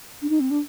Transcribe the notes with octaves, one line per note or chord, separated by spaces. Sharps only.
D4
D#4
C4
D4